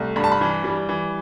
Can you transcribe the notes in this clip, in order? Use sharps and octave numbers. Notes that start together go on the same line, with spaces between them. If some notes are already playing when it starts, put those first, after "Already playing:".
Already playing: C2 A3
G2 B5
A5
B5
E3
G3
E3